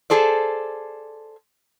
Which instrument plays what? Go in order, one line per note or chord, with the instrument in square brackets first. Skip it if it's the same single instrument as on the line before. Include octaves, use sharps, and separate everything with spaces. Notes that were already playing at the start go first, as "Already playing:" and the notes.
[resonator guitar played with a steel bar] G#4 A4 C5 D5